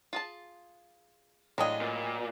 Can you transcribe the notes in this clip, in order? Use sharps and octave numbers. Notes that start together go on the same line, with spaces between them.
F4 G#4 A5
A2 F#3 G#3 D4 F4 D#5 G5 G#5
A#2